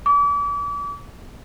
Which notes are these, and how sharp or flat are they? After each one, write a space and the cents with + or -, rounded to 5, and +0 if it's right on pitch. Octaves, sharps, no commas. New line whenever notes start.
D6 -40